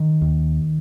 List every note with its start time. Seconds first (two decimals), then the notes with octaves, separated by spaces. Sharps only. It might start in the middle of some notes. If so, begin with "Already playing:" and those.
Already playing: D#3
0.21 D#2